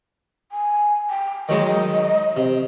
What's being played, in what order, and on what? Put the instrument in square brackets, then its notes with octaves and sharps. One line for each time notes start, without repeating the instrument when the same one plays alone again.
[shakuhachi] G#5
G5
[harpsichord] D#3 F#3 G#3 [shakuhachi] D#5
[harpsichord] C3